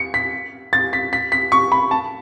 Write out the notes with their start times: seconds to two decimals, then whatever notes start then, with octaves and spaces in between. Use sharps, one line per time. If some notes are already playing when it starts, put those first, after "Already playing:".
Already playing: C#7
0.14 B6
0.73 A6
0.93 B6
1.13 B6
1.32 B6
1.52 C#6
1.72 B5
1.91 A5